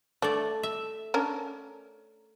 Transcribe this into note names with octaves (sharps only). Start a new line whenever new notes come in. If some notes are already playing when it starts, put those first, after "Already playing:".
A3 D4 D5
E5
C#4 D4 A#4